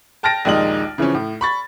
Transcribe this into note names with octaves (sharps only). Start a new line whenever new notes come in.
G5 A5 F6 A6 A#6 D7
A#1 D#2 G#3 D#4 F#7
C#3 E3 F3 C#4
A2
B5 C#6 A6